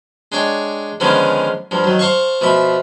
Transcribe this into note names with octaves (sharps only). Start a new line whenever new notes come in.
G#3 D4 C#5 G5
D3 D#3 F3 G#3 B3 C#4
G2 F3
D#3 F#3
C5 F5 A5 C#6
B2 F3 E5 B5